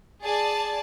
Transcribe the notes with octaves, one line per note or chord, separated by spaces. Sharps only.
G#4 D5 A5